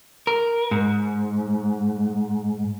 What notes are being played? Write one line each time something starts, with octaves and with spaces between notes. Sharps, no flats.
A#4
G#2